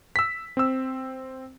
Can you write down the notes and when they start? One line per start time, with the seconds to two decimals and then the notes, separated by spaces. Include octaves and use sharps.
0.16 E6 B6
0.57 C4 E6